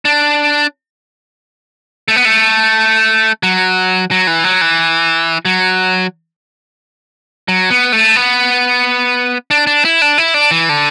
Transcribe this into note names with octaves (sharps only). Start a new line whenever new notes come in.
D4
A3
B3
A3
F#3
F#3
E3
F#3
E3
F#3
F#3
B3
A3
B3
D4
D4
E4
D4
E4
D4
E3
D3